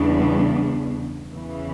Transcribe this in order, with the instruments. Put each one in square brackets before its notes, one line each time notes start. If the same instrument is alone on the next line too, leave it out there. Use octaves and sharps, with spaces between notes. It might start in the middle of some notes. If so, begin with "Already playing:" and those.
Already playing: [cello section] E2 C#3 G3 B3 D4
E2 C#3 E3